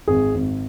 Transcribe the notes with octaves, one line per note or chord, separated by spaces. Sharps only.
G#1 G#4
G#1